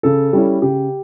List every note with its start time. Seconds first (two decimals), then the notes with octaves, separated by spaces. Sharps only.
0.03 C#3 A4
0.33 G3 C#4 E4
0.62 C#3 G4